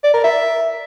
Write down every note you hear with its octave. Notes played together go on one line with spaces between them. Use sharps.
D5
A#4
E5